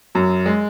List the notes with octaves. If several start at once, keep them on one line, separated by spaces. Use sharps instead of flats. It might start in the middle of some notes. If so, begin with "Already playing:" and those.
F#2 F#3
G#3